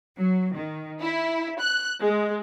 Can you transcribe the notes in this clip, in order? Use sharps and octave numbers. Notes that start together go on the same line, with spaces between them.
F#3
D#3
E4
F#6
G#3